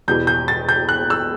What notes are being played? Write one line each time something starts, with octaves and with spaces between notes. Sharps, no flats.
E2 B2 G3 G6
G6
A6
G6
F#6
E6